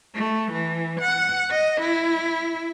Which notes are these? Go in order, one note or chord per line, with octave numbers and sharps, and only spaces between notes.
A3
E3
F#5
D#5
E4